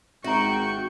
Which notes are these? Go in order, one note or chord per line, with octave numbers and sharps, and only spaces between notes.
G#1 F#4 E5 G5 A#5 C#6